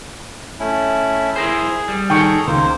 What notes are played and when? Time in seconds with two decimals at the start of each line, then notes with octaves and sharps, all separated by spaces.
0.60 A3 C#4 E4
1.36 E4 G#4 A#4 C5
1.88 G3
2.10 D#3 G#4 A4 G5 A#5 C#6
2.47 C#2 D#3 A#3 A#4 C5